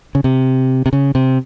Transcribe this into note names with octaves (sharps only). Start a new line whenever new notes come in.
C#3
C3
C3
C#3
C3